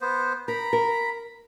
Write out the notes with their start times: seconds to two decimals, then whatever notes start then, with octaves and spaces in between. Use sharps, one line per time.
0.01 B3 C5
0.48 A#4 A#5 B5
0.73 A#4